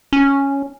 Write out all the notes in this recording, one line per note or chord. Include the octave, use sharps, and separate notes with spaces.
C#4